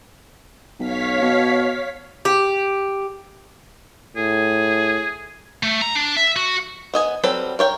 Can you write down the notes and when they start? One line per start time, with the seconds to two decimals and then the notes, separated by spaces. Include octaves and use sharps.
0.79 B1 C#5 F5 B6
1.22 B2
2.25 G4
4.16 A2 G#4
5.63 A3
5.82 A#5
5.95 D4
6.17 E5
6.36 F#4
6.94 B3 D#5 G#5
7.24 F#3 G3 C4 A4 B4
7.59 A#4 C#5 G5